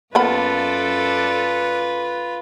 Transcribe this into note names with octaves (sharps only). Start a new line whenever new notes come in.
F#2 A#3 B3 F4 A4 B4 D5 B5